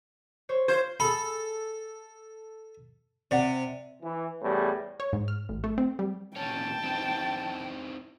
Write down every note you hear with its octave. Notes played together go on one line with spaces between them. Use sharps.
C5 C#5
F4 C5 G#6
G#4 A4 B5
C3 D5 F#5
E3
E2 A2 G3
C#5
G#2
F6
A1
A3
C4
G3
A#2 C#4 C#5 G5 A5
C4 D#4 E4